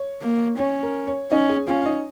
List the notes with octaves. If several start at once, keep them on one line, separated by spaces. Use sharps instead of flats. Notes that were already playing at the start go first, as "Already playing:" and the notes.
Already playing: C#5
A#3
C#4 C#5
A#4
C#5
C#4 D#4 D#5
G#4 G#5
C#4 F4 F5
F5
D#4 D#5